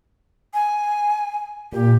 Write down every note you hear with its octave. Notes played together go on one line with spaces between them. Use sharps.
G#5
A#2 G4